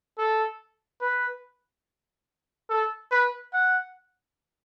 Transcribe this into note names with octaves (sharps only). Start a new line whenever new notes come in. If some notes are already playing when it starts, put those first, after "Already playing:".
A4
B4
A4
B4
F#5